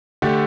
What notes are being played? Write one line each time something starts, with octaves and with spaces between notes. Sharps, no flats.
D3 A3 D4 G4